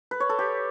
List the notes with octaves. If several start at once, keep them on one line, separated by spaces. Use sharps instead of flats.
B4
C#5
A4
G4